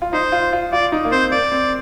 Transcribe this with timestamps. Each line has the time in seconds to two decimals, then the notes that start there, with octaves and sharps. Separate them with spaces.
0.02 F4
0.13 D#4 C5
0.32 F4
0.53 F4
0.73 F4 D5
0.92 D#4
1.05 A#3
1.12 C4 C5
1.32 A#3 D5
1.52 C4